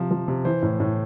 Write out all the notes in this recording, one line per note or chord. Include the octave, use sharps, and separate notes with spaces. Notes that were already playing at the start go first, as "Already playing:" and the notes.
Already playing: C3 F3
F3
C3
E3 C5
A2
A2